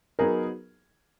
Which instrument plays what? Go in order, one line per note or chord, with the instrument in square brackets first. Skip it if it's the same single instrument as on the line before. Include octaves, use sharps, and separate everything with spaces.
[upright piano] F#3 B3 D#4 G#4 [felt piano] A#4